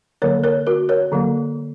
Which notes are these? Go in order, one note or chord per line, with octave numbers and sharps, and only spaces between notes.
D3 F#3 A#3 A#4 C#5
A#4 C#5
F#4 A#4
A#4 C#5
D3 F#3 A#3